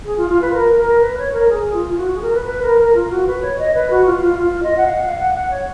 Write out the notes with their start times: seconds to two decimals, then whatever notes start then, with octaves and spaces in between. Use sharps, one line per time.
0.05 G#4
0.17 F4
0.29 F4
0.41 B4
0.53 A#4
0.77 A#4
1.01 B4
1.18 C#5
1.33 A#4
1.49 G#4
1.73 F4
1.89 F4
1.97 F#4
2.15 G#4
2.22 A#4
2.34 B4
2.45 B4
2.62 A#4
2.78 A#4
2.94 F4
3.10 F#4
3.27 B4
3.42 C#5
3.59 D#5
3.74 B4
3.90 F#4
4.06 F4
4.22 F4
4.39 F4
4.63 D#5
4.77 F#5
4.86 F5
4.95 F#5
5.03 F5
5.19 F#5
5.34 F#5
5.50 C#5